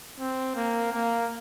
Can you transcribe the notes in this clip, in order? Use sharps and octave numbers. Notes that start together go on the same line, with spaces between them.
C4
A#3
A#3